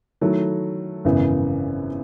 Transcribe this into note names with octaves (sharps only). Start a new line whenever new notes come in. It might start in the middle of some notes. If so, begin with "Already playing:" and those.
D#3 F#3 A3 E4 A4
G#1 F#2 C#3 E3 B3